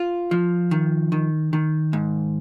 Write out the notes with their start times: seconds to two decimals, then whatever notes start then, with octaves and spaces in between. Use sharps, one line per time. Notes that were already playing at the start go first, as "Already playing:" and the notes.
Already playing: F4
0.31 F3
0.71 D#3
1.12 D#3
1.53 D#3
1.93 G#2